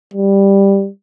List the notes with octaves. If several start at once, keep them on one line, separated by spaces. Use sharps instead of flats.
G3